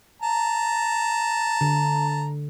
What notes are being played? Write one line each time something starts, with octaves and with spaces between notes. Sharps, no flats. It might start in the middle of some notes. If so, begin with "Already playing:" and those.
A5 A#5
D3